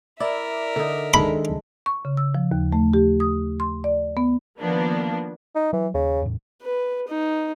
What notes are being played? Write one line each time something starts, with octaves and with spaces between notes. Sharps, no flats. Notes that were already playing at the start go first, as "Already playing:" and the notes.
E4 A#4 D5 E5
D3 D#4
D#3 G#3 D4 A4 B5
C#6
C#3
E6
F3
D#2
A3
G4
D#6
C6
D5
B3
D#3 F3 A#3 B3 D4
D#4
E3 F#3
D#2 C#3
E2 A2
B4
D#4